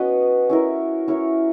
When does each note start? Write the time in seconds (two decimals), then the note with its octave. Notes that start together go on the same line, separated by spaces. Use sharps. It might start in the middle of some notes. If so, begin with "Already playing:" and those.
Already playing: B3 C#4 F#4 B4 D#5
0.49 C#4 E4 A#4
1.08 C#4 E4 A#4 C#5